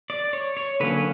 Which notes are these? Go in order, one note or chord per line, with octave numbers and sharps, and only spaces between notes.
D5
C#5
C#5
D3 F#3 A#3 C#4 B4